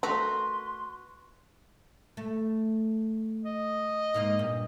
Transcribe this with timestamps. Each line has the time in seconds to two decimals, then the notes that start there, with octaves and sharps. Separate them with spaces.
0.03 A3 F#4 B4 A#5 C6
2.17 A3
3.44 D#5
4.14 G#2 A#3 F5
4.39 G2 A#2